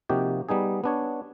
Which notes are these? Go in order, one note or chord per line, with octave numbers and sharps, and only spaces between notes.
C3 F3 A#3 D#4 F#4 G4
G3 B3 D#4 G#4
B3 D4 C#5